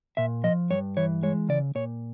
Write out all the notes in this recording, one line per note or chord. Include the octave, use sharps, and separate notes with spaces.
A#2 E5
F3 D#5
G2 C#5
E3 C#5
G#3 C#5
C#3 D5
A#2 C#5